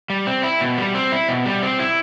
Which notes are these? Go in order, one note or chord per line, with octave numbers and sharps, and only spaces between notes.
G3
C4
E4
B2
G3
C4
E4
B2
G3
C4
E4